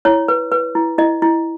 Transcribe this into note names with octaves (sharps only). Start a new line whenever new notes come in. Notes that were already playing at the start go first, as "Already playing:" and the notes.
E4 C#5
B4
B4
E4
E4 D#5
E4